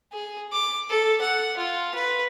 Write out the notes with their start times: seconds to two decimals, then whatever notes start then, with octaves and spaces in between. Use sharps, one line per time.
0.13 G#4
0.53 D6
0.90 A4
1.21 F#5
1.57 F4
1.95 B4